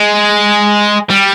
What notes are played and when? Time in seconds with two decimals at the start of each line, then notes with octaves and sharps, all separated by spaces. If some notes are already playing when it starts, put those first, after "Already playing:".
Already playing: G#3
1.09 G3